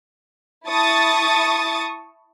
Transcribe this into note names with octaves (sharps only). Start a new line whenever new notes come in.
E4 A5 C#6 D#6 A6